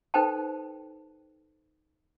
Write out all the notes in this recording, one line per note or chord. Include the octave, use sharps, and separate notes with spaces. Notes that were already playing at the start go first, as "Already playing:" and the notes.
D#4 A4 B4 C5 G5 A5